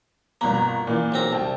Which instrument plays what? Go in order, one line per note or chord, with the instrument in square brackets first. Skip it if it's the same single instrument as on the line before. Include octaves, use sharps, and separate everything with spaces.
[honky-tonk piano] G1 B2 A#5 [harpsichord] A#3
[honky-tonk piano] A#2 E3
[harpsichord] B1 C4 A#5
[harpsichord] C2 [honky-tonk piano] G5 A5